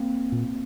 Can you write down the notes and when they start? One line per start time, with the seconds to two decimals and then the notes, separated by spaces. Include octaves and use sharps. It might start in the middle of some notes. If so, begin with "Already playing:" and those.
Already playing: A#3 C4
0.32 A#2